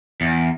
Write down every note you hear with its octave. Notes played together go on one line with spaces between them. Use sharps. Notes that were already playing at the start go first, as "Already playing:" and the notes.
E2